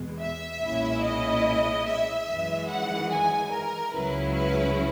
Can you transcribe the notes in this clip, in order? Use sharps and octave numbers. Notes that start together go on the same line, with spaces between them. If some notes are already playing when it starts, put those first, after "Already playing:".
Already playing: E2 B2 G#3 B3
E5
B1 A#2 G#3 C#4 E4
D#5
E5
F#2 E3 G#3
F#5
G#5
A#4
C#2 C#3 F#3 C#4 E4 B4
B4